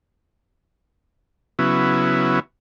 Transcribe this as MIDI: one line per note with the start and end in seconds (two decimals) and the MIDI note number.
1.59 2.40 49
1.59 2.40 54
1.59 2.40 59
1.59 2.40 64